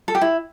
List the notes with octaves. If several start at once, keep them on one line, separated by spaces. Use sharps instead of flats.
A4
G4
E4